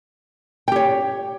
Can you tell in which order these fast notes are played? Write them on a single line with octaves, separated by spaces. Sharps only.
G5 G4 C#5